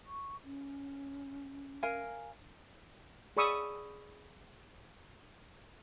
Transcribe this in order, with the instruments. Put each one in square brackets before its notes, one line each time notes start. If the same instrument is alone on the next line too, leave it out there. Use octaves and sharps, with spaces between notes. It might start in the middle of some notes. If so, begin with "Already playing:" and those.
[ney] C#6
C#4
[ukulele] A#4 F5 G#5
[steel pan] G#4 D5 B5 C#6 D#6 E6